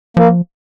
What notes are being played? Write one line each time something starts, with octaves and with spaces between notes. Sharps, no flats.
F3 A#3